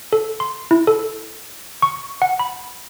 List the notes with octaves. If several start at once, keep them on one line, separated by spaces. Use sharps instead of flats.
A4
C6
E4
A4
C#6
F#5
B5